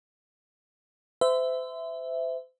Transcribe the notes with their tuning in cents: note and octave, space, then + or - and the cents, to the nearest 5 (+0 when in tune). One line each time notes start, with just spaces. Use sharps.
C5 -35 E5 +0